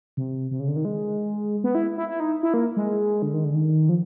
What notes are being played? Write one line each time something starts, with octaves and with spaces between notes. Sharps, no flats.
C3
C3
C#3
D3
D#3
G#3
B3
E4
E4
E4
D#4
E4
A#3
G#3
D3
D#3
D3
D#3
F3